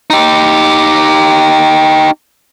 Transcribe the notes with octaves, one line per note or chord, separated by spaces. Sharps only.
D#4 G4